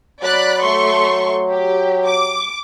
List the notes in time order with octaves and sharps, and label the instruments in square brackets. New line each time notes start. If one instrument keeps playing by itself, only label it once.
[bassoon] F#3 [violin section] D5 B5 F#6
[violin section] A3 C6 C#6
G4
D6